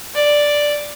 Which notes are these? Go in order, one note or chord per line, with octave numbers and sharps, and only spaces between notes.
D5